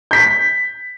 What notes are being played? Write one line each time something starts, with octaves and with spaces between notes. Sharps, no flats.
G6 B6